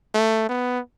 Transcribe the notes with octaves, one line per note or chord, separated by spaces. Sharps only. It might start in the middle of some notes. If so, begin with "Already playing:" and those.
A3
B3